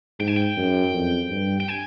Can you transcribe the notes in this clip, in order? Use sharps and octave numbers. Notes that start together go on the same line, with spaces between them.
G#2 G5
G#5
G5
F#2
F2
G2
G5
G#5